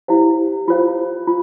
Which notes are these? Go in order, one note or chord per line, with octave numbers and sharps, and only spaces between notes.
E4 G4 C5 F5
F4 C5 F5
F4